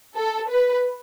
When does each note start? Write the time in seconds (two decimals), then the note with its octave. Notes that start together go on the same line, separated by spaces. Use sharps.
0.16 A4
0.49 B4